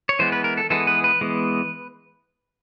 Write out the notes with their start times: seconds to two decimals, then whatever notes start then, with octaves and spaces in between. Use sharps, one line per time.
0.09 C#5
0.19 E3 G#3 B3 C5
0.32 B4
0.44 A#4
0.57 A4
0.70 E3 G#3 B3 A4
0.87 B4
1.04 B4
1.21 E3 G#3 B3